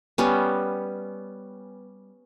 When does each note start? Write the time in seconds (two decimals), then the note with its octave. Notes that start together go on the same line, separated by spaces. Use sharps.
0.18 G3 B3 C#4